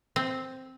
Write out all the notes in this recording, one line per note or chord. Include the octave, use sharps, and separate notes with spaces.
C4